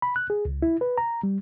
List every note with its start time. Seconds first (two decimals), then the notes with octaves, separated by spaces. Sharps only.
0.02 B5
0.16 F#6
0.30 G#4
0.45 C#2
0.62 E4
0.81 B4
0.98 A#5
1.23 G3